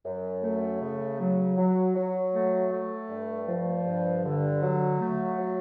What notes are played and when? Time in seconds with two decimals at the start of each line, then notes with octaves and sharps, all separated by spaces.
0.05 F#2
0.43 A3
0.81 C#3
1.19 F#3
1.57 F#3
1.96 F#3
2.34 A3
2.71 A3
3.10 G2
3.48 F3
3.87 G2
4.25 D3
4.63 F#3
5.01 A3
5.39 F#3